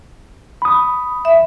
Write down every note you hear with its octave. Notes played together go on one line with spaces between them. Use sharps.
B5 D#6
E5